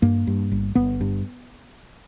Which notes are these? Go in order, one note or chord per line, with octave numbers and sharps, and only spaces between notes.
G2 A#3
G2
G1
G1 B3
G2